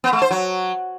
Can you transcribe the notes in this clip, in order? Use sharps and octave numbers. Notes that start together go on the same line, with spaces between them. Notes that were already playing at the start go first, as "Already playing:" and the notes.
B3
A3
C5
F#3